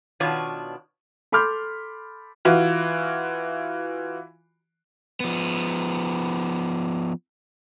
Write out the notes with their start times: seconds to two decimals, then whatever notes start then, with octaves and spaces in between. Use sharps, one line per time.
0.20 B2 D#3 B3 D4 F4 C#5
1.32 A4 B5 C6 D6 F6 G6
2.45 E3 F4 F#4
5.20 F3 B3